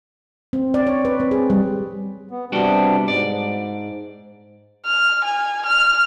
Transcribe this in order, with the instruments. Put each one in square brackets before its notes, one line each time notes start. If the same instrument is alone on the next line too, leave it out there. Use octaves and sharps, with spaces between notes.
[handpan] C4
D5
C#5
B4
C4
G#4
G3
[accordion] B3
[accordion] C3 B3 D4 [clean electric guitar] G3 F#4 G5
[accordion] G#2 [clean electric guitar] D5
[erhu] F6
G#5
F6